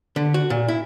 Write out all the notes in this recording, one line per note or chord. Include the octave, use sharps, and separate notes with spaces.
D3
F#4
A#2
E4